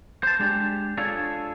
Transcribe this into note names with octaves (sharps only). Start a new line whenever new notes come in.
C5 A5
G#3 D4 G4
D4 F4 G#4 A4 C#5